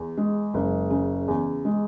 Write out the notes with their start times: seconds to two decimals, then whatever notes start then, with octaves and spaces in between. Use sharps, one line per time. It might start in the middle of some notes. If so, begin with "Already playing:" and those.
Already playing: E2
0.17 G#3
0.54 F#1
0.90 C#3
1.28 E2
1.65 G#3